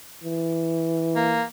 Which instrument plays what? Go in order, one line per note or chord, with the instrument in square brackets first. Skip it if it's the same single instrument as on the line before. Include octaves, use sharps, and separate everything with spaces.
[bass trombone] E3
[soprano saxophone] A#3